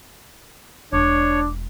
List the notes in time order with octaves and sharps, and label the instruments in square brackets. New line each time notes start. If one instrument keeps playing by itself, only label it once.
[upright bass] E1 E4 [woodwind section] D4 [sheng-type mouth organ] C#5 [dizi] D6